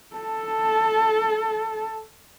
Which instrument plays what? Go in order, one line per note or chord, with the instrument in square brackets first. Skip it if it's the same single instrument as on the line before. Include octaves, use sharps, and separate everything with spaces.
[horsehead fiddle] A4 A5